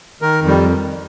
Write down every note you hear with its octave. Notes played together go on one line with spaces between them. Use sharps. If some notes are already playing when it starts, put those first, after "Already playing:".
D#3 A#4
F2
G3